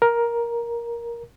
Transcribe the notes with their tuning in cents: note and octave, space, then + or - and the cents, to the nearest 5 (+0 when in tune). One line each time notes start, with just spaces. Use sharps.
A#4 +10